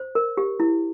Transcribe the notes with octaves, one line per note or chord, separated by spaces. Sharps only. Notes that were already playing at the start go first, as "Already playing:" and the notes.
Already playing: C5
A#4
G4
E4